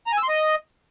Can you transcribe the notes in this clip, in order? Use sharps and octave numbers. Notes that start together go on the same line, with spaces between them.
A#5
G#5
E6
C6
D#5